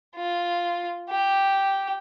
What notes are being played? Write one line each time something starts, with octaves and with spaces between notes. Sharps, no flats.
F4
G4